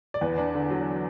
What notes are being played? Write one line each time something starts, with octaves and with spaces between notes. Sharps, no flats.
D5
E2 B4
D4
D3
F#3